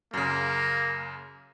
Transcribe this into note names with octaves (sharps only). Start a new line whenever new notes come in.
F#2 C#3 A#3